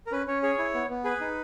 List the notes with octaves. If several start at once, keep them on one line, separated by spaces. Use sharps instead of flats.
A#4
C#4 B4
C#4 C#5
G#4 C#5
E4
B3
B3
G#4 B4
D#4